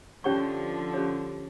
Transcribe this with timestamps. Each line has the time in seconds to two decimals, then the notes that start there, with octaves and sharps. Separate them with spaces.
0.24 D3 F3 C#4 G4 C#5 G5 C#6
0.94 C#4 G4 C#5